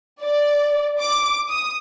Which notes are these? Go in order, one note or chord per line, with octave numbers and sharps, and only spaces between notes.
D5
D6
D#6